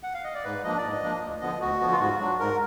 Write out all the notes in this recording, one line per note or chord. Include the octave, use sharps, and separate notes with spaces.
F#5
F5
D#5
D5
G#2 B4
F3 A#3 D4 D#5
D5
G#2
D#5
F3 A#3 D4
D2
D3 F3 B3 D#5
D2 F#4
D3 F3 B3
F4
G#2 F#4
F#3 D4
G#2 A#4